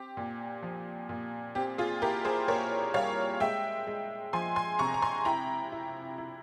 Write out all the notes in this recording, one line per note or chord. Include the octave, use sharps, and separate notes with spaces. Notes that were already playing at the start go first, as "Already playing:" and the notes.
Already playing: C4 G4
A#2
F3
A#2
C4 G4
F4 G#4
E4 G4 A#4
G#4 C5
A#2 A#4 C#5
G3 C#5 F5
G#3 E5 G5
G#3
F3 G#5 C6
G#5 C6
C3 A#5 C#6
A#5
G#5 C6
E4 G5 A#5
E4
E4